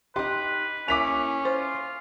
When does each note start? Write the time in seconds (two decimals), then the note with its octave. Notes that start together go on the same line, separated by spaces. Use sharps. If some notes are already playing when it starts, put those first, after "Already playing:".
0.16 D#4 G4 B4 C6
0.88 A#3 C#4 E4 D6 B6 F7
1.45 F4 C5